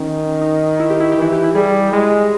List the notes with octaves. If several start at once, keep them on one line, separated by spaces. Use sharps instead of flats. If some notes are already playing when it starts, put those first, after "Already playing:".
Already playing: D#3 C#4
D#4
E4
G4
E4
G4
E3 E4
G4
E4
G3 G#4
G#3